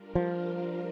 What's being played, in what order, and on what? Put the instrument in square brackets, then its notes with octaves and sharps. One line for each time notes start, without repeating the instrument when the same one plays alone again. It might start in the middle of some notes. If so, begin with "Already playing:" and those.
Already playing: [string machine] G3 D4 F4 A#4
[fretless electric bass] F3